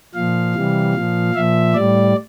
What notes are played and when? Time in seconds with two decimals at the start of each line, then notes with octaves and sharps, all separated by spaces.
0.14 A#2 F3 F5
0.55 C3 E3 G3
0.94 A#2 F3
1.34 A#2 F3 E5
1.74 A2 G3 D5